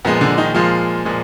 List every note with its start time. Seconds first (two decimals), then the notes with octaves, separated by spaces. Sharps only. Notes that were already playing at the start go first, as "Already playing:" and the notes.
0.05 A#2 F3 G#3 B3
0.21 D3 D4
0.38 D#3 D#4
0.55 A#2 F3 G#3 F4
1.05 A#2 F3 G#3